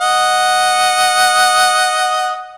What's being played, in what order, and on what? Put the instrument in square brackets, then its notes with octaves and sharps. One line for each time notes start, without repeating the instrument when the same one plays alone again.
[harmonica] D#5 F#5